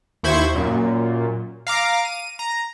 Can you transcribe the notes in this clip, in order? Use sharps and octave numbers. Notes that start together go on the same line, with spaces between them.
D#2 E4 C5 B5 C#6 G#6
F#2 A#2
F5 A#5 D6
D#7
A#5